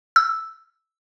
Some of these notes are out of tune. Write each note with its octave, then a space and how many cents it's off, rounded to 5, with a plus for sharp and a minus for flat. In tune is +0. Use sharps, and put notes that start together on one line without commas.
E6 +0